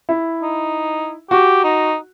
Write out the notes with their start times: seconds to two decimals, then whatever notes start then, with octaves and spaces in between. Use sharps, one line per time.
0.09 E4
0.42 D#4
1.31 F#4 G4
1.64 D#4